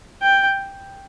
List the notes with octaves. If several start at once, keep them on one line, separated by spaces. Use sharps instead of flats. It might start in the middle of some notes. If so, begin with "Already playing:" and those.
G5